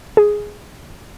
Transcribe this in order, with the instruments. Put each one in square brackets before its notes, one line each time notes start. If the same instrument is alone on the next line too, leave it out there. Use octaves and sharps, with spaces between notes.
[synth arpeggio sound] G#4